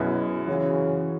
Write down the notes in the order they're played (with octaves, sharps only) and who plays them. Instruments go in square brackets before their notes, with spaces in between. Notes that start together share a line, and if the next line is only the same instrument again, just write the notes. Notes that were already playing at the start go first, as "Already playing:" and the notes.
Already playing: [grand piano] F#2 F#3 E4 G#4 [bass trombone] B2
[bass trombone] C#3 [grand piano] E3 C#4 F#4